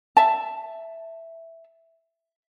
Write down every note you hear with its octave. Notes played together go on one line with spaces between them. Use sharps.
E5 A5